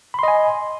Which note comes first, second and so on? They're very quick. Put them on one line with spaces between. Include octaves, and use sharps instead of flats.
B5 C6 D#5 G#5